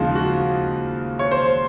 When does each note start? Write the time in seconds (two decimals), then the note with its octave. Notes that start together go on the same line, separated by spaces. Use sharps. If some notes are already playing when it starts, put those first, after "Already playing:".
Already playing: D#2 C#3 F3 G#3 D#4 F4
0.15 F#4
1.19 C#5
1.31 C5